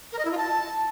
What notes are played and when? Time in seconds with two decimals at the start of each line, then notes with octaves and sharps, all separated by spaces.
0.12 A#4
0.18 D#5
0.25 E4
0.31 F4
0.37 A5